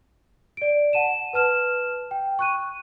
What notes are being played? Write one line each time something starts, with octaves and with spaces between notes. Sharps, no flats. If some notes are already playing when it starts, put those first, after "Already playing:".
D5 D7
F#5 A5 D#7 E7
B4 A5 F6 E7
G5
C#6 F#6 D#7